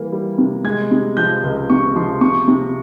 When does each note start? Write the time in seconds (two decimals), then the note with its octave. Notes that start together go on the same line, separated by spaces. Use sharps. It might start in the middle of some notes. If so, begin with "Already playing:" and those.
Already playing: E3 G3 A#3
0.12 G3
0.38 C3
0.64 G#3 G#6
0.91 C3
1.17 F3 G6
1.43 C#2
1.70 C3 C#6
1.96 F3 C6
2.21 C3 C#6
2.48 C3